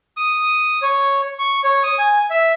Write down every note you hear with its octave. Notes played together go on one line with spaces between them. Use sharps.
D#6
C#5
C#6
C#5
D#6
G#5
E5